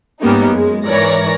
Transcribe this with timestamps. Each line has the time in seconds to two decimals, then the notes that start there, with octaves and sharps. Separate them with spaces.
0.21 G#2 G3 A#3 B3 C#4 D#4
0.52 F#2 G#3
0.85 G#2 E3 A#4 C#5 D5 A#6